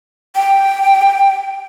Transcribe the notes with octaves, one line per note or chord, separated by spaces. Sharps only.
G5